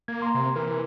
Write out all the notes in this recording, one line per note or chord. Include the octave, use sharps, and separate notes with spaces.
A#3 G#6
A#5 C6
C3
E3 A#4